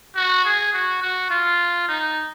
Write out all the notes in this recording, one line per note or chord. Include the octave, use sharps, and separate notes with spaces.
F#4
G#4
F#4
F#4
F4
D#4